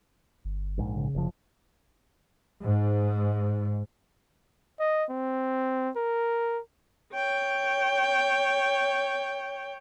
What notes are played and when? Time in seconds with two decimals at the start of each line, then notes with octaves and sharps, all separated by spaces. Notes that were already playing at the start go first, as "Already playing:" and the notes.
0.45 G1
0.78 A#1 G#2
0.97 C#3
1.15 F#1 F3
2.63 G#2
4.80 D#5
5.10 C4
5.96 A#4
7.13 C#5 G5